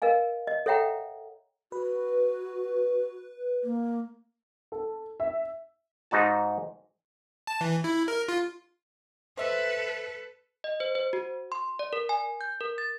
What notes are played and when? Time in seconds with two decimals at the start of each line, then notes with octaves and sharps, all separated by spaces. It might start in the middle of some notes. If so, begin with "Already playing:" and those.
0.02 A#4 D#5 F5 G#5
0.47 D#5
0.66 A4 C#5 E5 F#5 G5 A#5
1.72 F#4 B4
3.64 A#3
4.72 A4
5.20 E5
6.11 G#2 D#4 F#4 A5
7.47 A5
7.61 E3
7.84 E4
8.08 A#4
8.28 F4
9.37 A4 B4 C5 E5
10.64 D#5
10.80 C5
10.95 C5
11.13 F#4
11.52 C6
11.79 D5
11.93 A#4
12.09 G#5
12.41 G6
12.61 A#4
12.78 A6